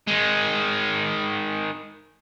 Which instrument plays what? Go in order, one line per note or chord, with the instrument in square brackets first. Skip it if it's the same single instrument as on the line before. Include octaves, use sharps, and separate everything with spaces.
[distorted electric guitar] D#3 G#3